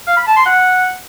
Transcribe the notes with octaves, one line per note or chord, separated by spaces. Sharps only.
F5
B5
A5
C6
F#5